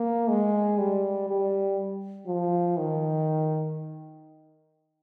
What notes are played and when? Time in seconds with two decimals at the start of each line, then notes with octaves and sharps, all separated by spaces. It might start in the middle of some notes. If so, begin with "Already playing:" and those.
Already playing: A#3
0.29 G#3
0.78 G3
1.28 G3
2.27 F3
2.77 D#3